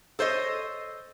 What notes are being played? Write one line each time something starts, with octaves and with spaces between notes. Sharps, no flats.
A4 C5 C#5 D#5